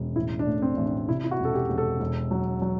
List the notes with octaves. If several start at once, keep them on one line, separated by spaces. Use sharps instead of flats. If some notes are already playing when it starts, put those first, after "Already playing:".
Already playing: E1
A1 E4
D4
A2
C4
A1
D4
C3 E4
E4
F#4
E1
A4
G4
E1
A4
E1
F#3
F#3